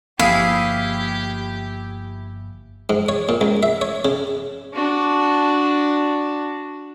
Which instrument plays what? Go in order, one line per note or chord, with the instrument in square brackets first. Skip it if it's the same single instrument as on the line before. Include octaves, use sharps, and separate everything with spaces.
[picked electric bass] G1 F3 A#3 [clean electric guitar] E4 G#4 [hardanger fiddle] G4 [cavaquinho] F5
[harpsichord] G#2
C#5
A#2
C#2
E5
C#5
C#3
[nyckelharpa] D4 F#4